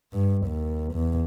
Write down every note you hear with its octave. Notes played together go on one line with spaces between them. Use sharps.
G2
D#2
E2